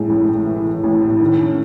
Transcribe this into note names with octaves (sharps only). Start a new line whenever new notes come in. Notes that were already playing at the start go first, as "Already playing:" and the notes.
Already playing: A2 G#3
A1
A1
E3
E3
A1
A2
D#3
C#4